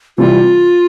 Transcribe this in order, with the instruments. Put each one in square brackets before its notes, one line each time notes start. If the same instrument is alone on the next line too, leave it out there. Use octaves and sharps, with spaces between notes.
[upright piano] C3 E3 G3 [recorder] F4